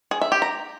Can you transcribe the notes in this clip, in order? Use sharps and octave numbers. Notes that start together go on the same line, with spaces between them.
G#4
E5
G4
A#5